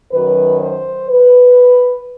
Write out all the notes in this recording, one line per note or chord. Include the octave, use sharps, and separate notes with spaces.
F#2 D#3 F#3 B4
C5
B4